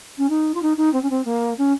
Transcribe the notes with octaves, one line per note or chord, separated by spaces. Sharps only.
C#4
D#4
F4
D#4
D#4
C4
C#4
C4
A#3
C#4